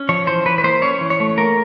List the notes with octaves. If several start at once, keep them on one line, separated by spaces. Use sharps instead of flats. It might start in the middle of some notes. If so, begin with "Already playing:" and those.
Already playing: C#4
F3 C#5
E3 C5
E3 B4
B4
A#3 C5
C#4 C#5
E3
C#5
A3
A#3 A#4